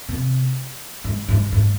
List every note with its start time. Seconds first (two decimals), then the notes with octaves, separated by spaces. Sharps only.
0.09 C3
1.04 G#2
1.28 G#2
1.52 G#2